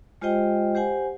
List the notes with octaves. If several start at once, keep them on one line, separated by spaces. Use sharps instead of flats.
G#3 F4 G4 C5 D#5 G5
G4 C5 F#5 G#5